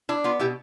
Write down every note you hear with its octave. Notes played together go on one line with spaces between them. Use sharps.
D4 E4
B3 F4
B2 E4 G4